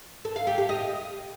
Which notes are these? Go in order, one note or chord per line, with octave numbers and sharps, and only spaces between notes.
A4
F5
G4
G4
D#5